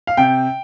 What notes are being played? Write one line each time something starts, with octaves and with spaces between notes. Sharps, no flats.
F5
C3 G5